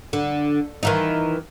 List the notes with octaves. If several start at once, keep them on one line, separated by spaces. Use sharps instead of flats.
D3
D#3 E3 D#4